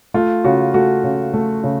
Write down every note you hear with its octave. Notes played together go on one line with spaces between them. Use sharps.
A3 F4
C#3 F#4
A3 F#4
C#3
A3
C#3